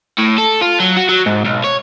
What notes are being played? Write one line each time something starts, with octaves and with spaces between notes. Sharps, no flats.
A2
A4
F4
F#3
F#4
F#3
G#2
B1
C#5